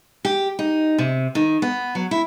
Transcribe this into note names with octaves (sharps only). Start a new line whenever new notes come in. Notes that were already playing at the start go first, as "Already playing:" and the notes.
G4
D#4
C3
D#3
B3
F#3
E4